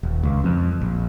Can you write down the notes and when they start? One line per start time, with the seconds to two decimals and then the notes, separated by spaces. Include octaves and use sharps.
0.03 D#1
0.23 C#2
0.44 F2
0.81 A#1